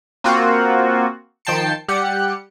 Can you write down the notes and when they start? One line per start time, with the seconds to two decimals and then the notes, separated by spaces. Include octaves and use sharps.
0.24 A#3 C4 F4 F#4
1.45 D#3 F3 G5 A5 C7 C#7
1.88 G3 G4 F#5 C#7